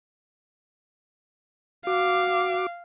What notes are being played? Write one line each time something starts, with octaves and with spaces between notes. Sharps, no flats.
F#4 F5 D6